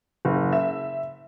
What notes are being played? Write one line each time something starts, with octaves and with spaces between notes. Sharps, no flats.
F#1
E5